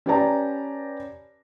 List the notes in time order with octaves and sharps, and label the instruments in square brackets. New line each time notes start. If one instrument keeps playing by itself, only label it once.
[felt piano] C#4 G4 B4 D5 A5 A#5